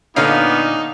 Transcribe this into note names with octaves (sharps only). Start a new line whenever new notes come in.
A#2 D3 B3 D#4 C#5 F5